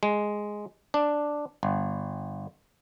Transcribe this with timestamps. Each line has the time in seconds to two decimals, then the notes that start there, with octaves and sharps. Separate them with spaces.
0.03 G#3
0.94 D4
1.63 G1